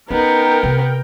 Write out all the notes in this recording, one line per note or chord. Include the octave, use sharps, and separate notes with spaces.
B3 C#4 D#4 A#4 G5
C3